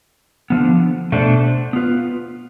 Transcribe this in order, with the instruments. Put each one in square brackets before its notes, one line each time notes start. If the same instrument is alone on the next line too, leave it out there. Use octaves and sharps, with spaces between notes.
[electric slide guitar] D3 F3 B3
B2 A3 D4 A4 C5
B3 F4 B4